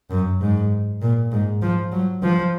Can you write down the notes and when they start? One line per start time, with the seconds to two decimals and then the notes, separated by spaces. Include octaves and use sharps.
0.10 F#2
0.41 G#2
1.02 A#2
1.32 G#2
1.62 F3
1.92 F#3
2.22 F3